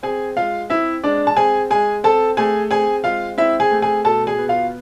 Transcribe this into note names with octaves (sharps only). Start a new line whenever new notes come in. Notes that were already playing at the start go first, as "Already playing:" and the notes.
C4 G#4 G#5
G#3 F4 F5
C4 E4 E5
G#3 D4 D5
A5
C4 G#4 G#5
G#3 G#4 G#5
C4 A4 A5
A3 G#4 G#5
C4 G#4 G#5
G#3 F4 F5
C4 E4 E5
G#4 G#5
A3
G#4 G#5
B2 A4 A5
G#4 G#5
B3
F4 F5